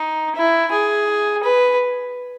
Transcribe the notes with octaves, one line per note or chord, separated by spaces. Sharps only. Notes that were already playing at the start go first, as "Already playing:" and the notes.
Already playing: D#4
E4
G#4
B4